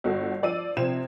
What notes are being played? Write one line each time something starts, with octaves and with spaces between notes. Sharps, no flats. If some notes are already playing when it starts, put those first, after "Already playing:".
G1 F#4 A4
F3 D5 E6 D#7
C3 F3 C4 G#6 E7